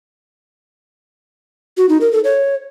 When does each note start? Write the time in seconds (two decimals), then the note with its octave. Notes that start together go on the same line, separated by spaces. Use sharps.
1.77 F#4
1.89 D#4
2.01 A#4
2.12 A4
2.24 C#5